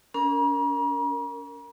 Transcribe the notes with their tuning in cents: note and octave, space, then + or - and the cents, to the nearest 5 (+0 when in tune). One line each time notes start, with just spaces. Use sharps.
C#4 +40 A#4 -20 A#5 +45